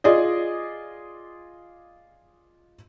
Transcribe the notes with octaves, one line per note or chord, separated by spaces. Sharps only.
F4 G#4 D5 D#5